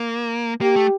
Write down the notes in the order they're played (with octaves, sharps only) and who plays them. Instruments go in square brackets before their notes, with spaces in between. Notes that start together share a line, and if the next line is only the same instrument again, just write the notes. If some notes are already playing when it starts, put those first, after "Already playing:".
Already playing: [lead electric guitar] A#3
[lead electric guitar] A#3 [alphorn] G4
[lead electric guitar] A3